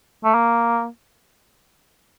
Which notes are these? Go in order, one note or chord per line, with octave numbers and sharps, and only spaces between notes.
A3
A#3